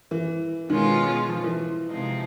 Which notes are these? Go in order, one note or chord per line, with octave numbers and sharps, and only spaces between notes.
E3
B2 D#3 G#3 C#4 F4
F3
E3
C3 F3 G#3 C4 D#4